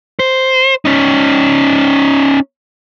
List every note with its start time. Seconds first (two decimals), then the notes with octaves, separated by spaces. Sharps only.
0.19 C5
0.85 C#4 D#4